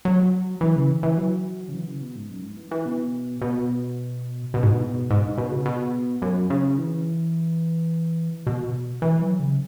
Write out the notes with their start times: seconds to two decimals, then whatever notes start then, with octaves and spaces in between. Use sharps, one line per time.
0.05 F#3
0.61 E3
0.76 C#3
0.89 E3
1.03 E3
1.18 F#3
1.69 C#3
1.73 E3
1.87 C#3
2.01 B2
2.15 G#2
2.30 F#2
2.44 G#2
2.57 E3
2.71 E3
2.86 B2
3.42 B2
4.54 B2
4.63 G#2
4.72 B2
5.10 G#2
5.38 B2
5.51 C#3
5.66 B2
6.22 F#2
6.50 C#3
6.78 E3
8.47 B2
9.02 E3
9.21 F#3
9.40 C#3